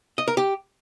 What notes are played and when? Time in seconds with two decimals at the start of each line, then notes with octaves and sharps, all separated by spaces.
0.18 D#5
0.28 A#4
0.37 G4